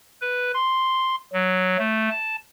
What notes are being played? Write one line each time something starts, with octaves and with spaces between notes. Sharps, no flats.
B4
C6
F#3
A3
A5